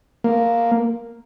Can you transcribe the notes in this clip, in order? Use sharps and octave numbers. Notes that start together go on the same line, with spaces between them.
A#3